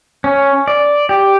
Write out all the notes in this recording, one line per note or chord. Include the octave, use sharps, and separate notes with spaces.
C#4
D5
G4